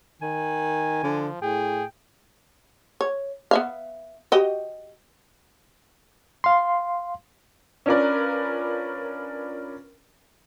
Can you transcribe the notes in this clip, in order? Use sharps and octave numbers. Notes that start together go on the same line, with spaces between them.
D#3 G#5
D3 F3
A2 G#4 G5
C#5
B3 E5 F5
F#4 G4 D#5
F5 C6
C#4 D4 F4 A#4 B4 D5